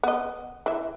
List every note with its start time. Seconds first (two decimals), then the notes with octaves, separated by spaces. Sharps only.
0.03 B3 D#5
0.66 E3 E5